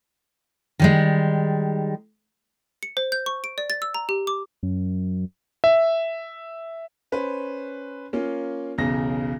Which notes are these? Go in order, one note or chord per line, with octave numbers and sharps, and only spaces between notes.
D#3 G3 G#3
C#7
C5
G6
C#6
D7
D5
A6
E6
A#5
G4
D6
F#2
E5
C#4 B4 C5
A#3 C#4 F4
B1 E2 C#3 A#6